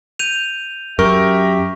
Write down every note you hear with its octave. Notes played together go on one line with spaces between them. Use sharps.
G6 D#7 F7
F#2 G4 A#4 E5 C#6